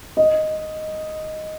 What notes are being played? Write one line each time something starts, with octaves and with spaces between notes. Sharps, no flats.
D#5